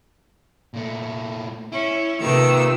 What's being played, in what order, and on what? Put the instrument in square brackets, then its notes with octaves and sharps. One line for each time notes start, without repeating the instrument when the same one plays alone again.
[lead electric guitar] A#2 A3
[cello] C#4 [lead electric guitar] E4
[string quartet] C3 A3 E6 [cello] D#3 [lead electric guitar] A#3 [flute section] F4 G4 B4